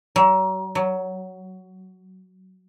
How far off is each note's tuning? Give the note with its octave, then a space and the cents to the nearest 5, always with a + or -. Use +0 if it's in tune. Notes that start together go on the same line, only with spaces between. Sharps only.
F#3 +35
F#3 +10